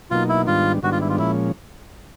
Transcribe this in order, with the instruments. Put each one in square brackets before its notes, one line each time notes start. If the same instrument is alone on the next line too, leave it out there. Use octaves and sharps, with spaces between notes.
[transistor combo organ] B2 F#3 A#3 D#4 [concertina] F4
[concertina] E4
[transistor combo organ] G#2 D#3 G3 B3 D4 [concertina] F4
[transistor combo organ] G#2 D#3 G3 B3 D4 [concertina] F#4
[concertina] F4
E4
F4
[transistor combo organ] A#2 F3 G#3 C#4 [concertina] E4